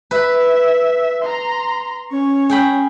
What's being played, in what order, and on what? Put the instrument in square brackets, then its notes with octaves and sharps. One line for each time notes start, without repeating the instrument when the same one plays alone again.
[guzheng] B4 [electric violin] E5
[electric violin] A#5 C6
[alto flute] C#4 [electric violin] C#5
[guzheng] G#4 G5 B5